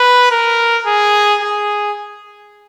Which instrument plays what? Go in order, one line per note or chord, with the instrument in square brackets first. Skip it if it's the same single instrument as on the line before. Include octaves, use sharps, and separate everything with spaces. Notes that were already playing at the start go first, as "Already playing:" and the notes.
Already playing: [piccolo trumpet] B4
A#4
G#4
G#4